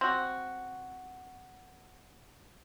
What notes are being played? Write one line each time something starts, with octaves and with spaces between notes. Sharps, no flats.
C4 F#4